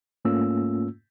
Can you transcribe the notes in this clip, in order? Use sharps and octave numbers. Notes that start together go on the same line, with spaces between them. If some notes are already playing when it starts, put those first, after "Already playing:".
G#2 A3 A#3 C#4 F4 E6